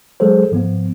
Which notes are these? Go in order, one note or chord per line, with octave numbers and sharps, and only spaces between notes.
F#3 G#3 G#4 A4 C5
G#2 F3 B3